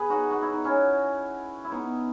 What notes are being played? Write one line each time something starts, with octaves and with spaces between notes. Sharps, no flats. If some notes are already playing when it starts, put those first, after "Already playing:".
Already playing: G#4 B4
D#4 F#4
F#4
E4
D#4
C#4 E4
E4
B3 D#4